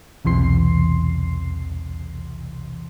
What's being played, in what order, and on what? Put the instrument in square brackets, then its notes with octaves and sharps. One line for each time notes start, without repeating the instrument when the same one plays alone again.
[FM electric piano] B1 E2 C3 E3 C6 C7